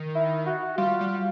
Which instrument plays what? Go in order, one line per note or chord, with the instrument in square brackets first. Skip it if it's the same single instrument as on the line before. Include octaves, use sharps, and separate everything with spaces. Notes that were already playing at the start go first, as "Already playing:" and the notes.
Already playing: [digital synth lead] D#3
[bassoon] E4
F#4
[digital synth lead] G3 [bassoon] F4
[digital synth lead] G3